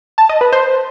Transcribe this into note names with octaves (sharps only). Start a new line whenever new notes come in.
A5
D#5
B4
C5